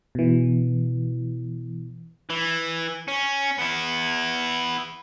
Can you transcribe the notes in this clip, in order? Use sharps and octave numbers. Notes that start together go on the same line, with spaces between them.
B2 E3
E3
C#4
B3 E4